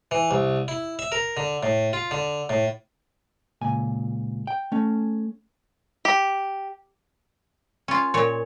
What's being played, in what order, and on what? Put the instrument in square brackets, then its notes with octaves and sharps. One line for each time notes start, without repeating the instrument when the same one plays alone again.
[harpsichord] E3
C2
E4
E5
A#4
D3
A2
F4
D3
A2
[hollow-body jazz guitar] C#2 A#2 G#5
G5
A3 C#4
[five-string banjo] G4
[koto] C#4 F4
A#2 C#5